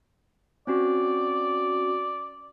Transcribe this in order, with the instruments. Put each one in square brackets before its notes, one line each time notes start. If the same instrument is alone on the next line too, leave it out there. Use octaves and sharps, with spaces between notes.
[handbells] C4 C#4 F#4 [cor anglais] D5